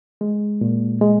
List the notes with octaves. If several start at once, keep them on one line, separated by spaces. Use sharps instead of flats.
G#3
A#2
G#3